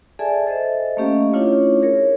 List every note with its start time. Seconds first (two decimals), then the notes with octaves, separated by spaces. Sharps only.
0.19 G#4 A4 D5 E5 G#5 A5
0.47 A4 C5 D#5 E5
0.97 A3 A#3 C#4 G4 D#5 F5
1.33 A3 C#4 D4 E4 F4 C#5
1.82 G#4 A#4 C#5